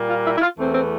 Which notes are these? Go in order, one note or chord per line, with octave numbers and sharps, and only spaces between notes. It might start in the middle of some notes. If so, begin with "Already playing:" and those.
Already playing: A#2 G3 A#3
F4
E4
E4
F4
E2 E3 A3 C4
C4